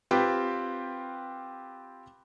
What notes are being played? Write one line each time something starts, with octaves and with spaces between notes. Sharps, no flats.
C4 F4 G4 B4 G5